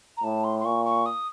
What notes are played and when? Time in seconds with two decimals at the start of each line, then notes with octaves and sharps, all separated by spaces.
0.17 A#5
0.23 A2 A5
0.44 C6
0.59 C6
0.64 A#2 C#6
0.85 C#6
1.05 D#6